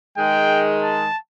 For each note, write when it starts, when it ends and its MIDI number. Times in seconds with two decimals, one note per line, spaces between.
0.18 1.06 51
0.18 1.06 56
0.18 0.66 79
0.82 1.18 81